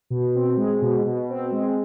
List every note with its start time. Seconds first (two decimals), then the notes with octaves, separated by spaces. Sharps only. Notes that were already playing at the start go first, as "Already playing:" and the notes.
0.10 B2
0.35 C4
0.57 G#3
0.82 B2
1.06 B2
1.29 C4
1.52 G#3